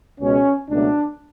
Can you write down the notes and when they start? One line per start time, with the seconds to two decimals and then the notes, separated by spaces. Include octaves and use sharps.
0.19 C#2 B2 G#3 C#4
0.70 C#2 B2 F#3 A3 D4